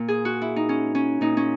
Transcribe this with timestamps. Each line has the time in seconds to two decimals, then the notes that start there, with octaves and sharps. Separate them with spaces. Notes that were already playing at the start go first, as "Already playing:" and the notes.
Already playing: A#2
0.08 G#4
0.25 F#4
0.41 E4
0.56 D#4
0.69 C#4
0.95 C#4
1.21 A#2 D#4
1.37 C#4